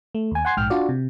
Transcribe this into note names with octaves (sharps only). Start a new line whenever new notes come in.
A3
D#2 G#5
F#5 G#5 C6 G#6 C7
A#1 G#2 G5 F6
D4 F4 F#4 D5
C3